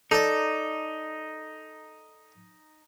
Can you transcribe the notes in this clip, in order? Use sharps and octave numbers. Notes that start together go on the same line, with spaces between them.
D#4 A4 D5